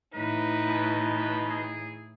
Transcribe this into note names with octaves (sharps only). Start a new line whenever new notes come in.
A2 E3 D#4 B4
B2
B4
G#4